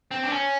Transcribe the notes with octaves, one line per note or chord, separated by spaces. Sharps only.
C4
D4
C#4